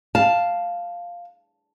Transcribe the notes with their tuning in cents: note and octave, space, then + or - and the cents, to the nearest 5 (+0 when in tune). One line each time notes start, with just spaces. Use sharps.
F5 +0 A5 +0